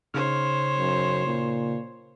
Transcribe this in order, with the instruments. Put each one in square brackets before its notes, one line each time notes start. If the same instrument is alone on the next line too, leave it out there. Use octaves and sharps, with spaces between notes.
[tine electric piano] C#3 D#4 F6 [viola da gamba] C5 C#5
[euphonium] F#2
A#2